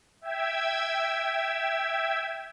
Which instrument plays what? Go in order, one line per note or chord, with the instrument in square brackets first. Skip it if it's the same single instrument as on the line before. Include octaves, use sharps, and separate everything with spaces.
[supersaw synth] E5 G5 E6 G#6